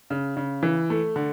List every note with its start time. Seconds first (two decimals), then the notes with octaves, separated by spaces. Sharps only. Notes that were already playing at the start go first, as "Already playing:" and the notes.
0.10 C#3
0.37 C#3
0.63 E3
0.90 A3
1.16 D3